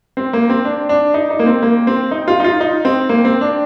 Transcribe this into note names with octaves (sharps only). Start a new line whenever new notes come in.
C4
A#3
C4
D4
D4
D#4
D#4
A#3
C4
A#3
C4
D#4
F4
D#4
F4
D#4
C4
A#3
C4
D4